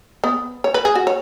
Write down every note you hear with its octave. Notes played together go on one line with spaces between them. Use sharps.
B3
C#5
B4
G#4
F#4
C#5